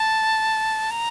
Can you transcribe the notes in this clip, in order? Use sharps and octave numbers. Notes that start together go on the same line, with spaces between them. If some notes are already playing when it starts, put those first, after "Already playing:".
Already playing: A5
A#5